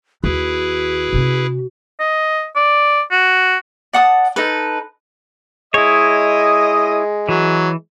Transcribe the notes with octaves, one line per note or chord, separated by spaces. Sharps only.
D#2 E4 F#4 G#4 B4
C3 C#4
D#5
D5
F#4
D5 F#5 A5 D#6
D#4 A4 B4
G#3 E4 C#5 D#5 D#6
E3 F#3